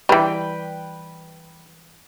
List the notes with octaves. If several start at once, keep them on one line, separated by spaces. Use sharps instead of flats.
E3 G3 B4 G5